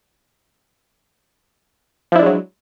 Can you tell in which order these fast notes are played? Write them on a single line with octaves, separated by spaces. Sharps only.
F3 E4 D4 G#3 F#3